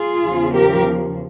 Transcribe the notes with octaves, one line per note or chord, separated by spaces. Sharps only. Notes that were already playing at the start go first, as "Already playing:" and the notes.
Already playing: F4 G#4
E2 C#3 F3
G4 A#4